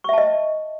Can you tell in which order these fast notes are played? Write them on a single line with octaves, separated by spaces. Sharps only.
C#6 E5 A5 D#5